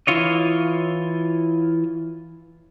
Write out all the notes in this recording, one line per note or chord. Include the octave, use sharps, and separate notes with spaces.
E3 E4 F4 C#5 D#5